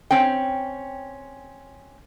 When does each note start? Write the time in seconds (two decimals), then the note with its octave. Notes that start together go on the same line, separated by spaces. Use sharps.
0.11 C4 C#4 G5